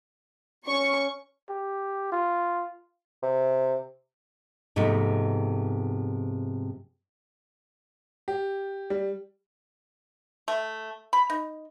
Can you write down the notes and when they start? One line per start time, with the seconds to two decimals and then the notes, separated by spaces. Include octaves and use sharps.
0.68 C#4 C#6
1.49 G4
2.12 F4
3.23 C3
4.76 G#2 C3 F3 A3 B3 D#4
8.28 G4
8.90 G3
10.48 A3
11.13 B5
11.30 D#4